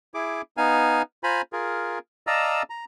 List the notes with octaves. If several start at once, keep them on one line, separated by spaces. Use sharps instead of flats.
E4 G#4 D6
B3 D#4 F5 G#5
F4 C5 G#5 A#5 B5
F4 G#4 A#4
D5 D#5 F5 A5 A#5 E6
A#5